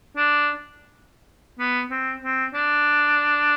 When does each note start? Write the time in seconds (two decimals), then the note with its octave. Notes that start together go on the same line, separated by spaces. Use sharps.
0.17 D4
1.59 B3
1.91 C4
2.23 C4
2.54 D4